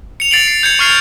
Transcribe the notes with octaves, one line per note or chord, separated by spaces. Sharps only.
C#7 F7
A6 C7 D7 F7 F#7
C7
G6 G#6 C#7
C#6 F6 C7 F7